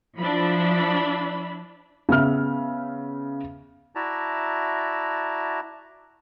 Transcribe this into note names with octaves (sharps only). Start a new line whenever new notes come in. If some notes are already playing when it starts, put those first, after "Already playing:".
F3 D4 E4 B5
C#3 B3 E5 F6
E4 F#4 D5 E5 A5 A#5